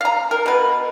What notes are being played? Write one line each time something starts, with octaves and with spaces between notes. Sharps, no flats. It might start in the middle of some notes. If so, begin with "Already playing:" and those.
F5 A#5
A#4
B2 B4